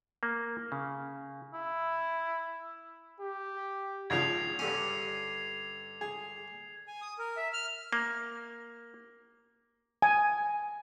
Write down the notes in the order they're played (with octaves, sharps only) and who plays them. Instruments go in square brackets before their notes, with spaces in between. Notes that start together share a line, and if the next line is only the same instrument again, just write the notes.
[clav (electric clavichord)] A#3
C#3
[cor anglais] E4
[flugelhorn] G4
[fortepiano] G#1 C#3 F3 [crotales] G#6 C7 F7
[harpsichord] G2 D3 C#4
[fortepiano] G#4
[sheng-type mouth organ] G#5
D#6
A#4
E5
F6
[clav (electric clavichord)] A#3
[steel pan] G#5